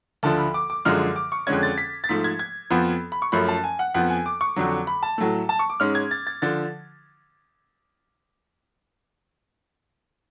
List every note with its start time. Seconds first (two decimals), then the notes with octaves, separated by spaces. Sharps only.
0.23 D2 D3 F3 A5
0.39 B5
0.54 D6
0.70 D6
0.85 F#2 D3 F3 G#3 F6
1.16 D6
1.32 C#6
1.47 F2 D3 G#3 C#4 G#6
1.63 A6
1.78 B6
2.04 A6
2.09 G#2 F3 A3 B6
2.24 G#6
2.39 G#6
2.70 F2 F3 B3 B5
3.12 B5
3.22 C#6
3.32 F#2 F3 A3 C#4 B5
3.48 A5
3.64 G#5
3.79 F#5
3.94 F2 F3 B3 F#5
4.10 G#5
4.26 D6
4.41 C#6
4.56 F2 D3 F#3
4.87 B5
5.03 A5
5.18 A2 F#3 A3
5.49 A5
5.59 C#6
5.70 D6
5.80 G#2 G#3 C#4 F6
5.95 G#6
6.11 A6
6.27 A6
6.42 D3 F3 A6